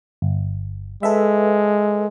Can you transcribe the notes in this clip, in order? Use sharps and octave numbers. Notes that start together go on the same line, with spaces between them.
G1
G#3 A4 B4 E5